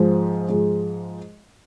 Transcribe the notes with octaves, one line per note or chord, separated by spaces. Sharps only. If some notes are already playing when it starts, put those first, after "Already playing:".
Already playing: G#2 F3 G#3
G#2 F3 G#3